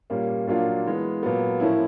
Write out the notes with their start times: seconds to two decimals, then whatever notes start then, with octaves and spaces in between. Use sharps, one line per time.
0.10 A#2 G3 A#3 C#4
0.47 A#2 F#3 A#3 D4 F4
0.85 E3 G#3 B3
1.23 A#2 F#3 B3
1.60 A2 F3 A#3 C#4 E4